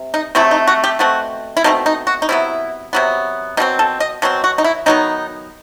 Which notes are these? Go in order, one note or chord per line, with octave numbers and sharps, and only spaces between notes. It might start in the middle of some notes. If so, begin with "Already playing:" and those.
Already playing: C3
D#4
C3 F#3 A3 C4 E4
D#4
F#4
G4
B2 A3 C4 F#4
E4
B2 A3 C4 D#4
D#4
F#4
D#4
C3 F#3 B3 E4
C3 F#3 B3
B2 F#3 C4 D#4
A4
D#5
B2 F#3 C4
F#4
D#4
E4
D#3 F#3 B3 D#4